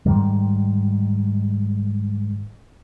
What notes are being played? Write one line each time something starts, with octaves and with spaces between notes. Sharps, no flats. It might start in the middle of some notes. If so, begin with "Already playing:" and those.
G#2 D#3 G3